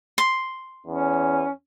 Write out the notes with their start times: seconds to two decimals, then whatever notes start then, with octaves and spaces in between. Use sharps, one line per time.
0.18 C6
0.87 E2 C#4